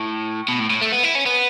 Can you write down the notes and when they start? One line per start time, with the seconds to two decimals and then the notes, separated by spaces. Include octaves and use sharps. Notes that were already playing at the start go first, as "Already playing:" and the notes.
Already playing: A2
0.48 B2
0.59 A2
0.70 A2
0.81 A3
0.92 B3
1.03 E4
1.15 C#4
1.26 B3